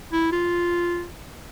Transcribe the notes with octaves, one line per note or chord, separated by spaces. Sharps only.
E4
F4